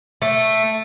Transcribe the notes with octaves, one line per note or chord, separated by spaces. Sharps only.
A3